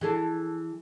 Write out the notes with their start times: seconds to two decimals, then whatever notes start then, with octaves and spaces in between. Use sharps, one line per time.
0.01 E3 G#4 A4